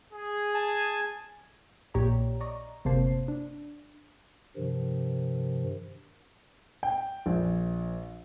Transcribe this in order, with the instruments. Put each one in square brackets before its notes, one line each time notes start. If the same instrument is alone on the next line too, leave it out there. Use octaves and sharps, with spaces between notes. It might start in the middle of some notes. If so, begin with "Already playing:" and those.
[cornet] G#4
[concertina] G#5 A5
[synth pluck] A#1 A#2 G4 C#5 D5 A#5
D5 D#5 A#5 C#6
G1 C3 A#3 C5 A5 C7
D4
[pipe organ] G2 C3 D#3 F3
[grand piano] G5
A#1